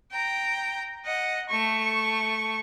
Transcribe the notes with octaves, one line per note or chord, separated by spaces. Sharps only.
G5 A#5
D#5 F#5
A3 C#6